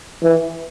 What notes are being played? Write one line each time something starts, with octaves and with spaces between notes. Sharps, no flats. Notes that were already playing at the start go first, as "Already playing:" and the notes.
E3